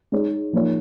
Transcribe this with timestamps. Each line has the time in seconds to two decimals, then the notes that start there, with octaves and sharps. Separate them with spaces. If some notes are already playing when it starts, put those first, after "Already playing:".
0.12 G#3 D#4 C#5
0.53 F3 A#3 D#4 C#5